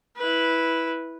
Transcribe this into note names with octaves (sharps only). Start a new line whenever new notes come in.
E4 B4